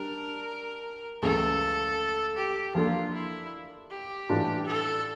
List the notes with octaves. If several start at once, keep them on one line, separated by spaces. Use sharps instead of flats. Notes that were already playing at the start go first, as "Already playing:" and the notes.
Already playing: G3 D4 A#4
C#2 C#3 E3 A3 A4
G4
F3 A#3 D4 F4 A4
E4
G4
A2 E3 G3 D4 F4
A4